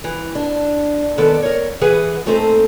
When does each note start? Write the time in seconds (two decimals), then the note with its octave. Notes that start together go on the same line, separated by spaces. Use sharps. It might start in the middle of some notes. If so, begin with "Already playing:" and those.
0.04 E3
0.35 D4
1.18 D#3 G#3 B3 A4 D5
1.42 A#4 C#5
1.81 E3 G#4 B4 E5 F#5
2.26 A#2 A3 C4 D#4 A4 C5